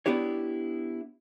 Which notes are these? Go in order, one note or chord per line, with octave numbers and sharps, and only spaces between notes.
B3 D4 E4 G4 C#5